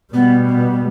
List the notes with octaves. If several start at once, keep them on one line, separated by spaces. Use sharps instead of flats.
B2 G3 B3
B3